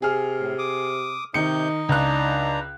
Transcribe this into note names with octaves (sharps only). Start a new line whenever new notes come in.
C3 G#4 F6
A2
D6 D#6
C3 D#3 D#4 G6 C#7
C#2 D4 A#5 F#6